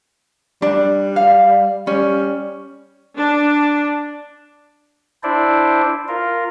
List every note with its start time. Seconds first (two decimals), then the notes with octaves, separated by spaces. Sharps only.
0.62 G3 D4
1.16 F5
1.87 G3 C#4
3.17 D4
5.23 D4 E4 C5 D5
6.08 F4 A#4